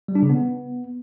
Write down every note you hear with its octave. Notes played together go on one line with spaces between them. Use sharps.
G3
D4
C#3
B3